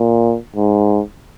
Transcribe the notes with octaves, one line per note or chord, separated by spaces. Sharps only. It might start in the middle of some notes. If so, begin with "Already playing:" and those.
Already playing: A#2
G#2